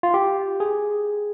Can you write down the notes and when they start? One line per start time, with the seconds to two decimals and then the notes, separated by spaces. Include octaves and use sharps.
0.03 F4
0.14 G4
0.60 G#4